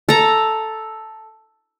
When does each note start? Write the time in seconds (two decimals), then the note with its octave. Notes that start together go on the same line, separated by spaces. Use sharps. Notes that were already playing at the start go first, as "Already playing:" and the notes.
0.09 A4 A#5